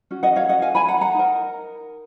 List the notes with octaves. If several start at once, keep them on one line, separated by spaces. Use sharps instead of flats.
C#4 F#4
D#5 F#5
C#5 F5
D#5 F#5
F5 G#5
G#5 B5
F#5 A#5
F#5 A#5
D#4 A#4